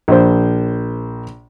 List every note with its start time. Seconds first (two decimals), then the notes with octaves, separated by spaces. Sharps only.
0.08 A#1 C5